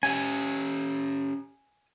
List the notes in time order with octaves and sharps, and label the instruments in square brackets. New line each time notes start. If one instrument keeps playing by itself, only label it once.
[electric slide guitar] C#4 G4 [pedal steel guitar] G#5